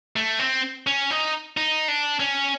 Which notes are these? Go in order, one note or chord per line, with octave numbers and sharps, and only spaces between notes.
A3
C4
C#4
D#4
D#4
D4
C#4